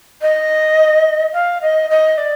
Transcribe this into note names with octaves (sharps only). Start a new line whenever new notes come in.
D#5
F5
D#5
D#5
D5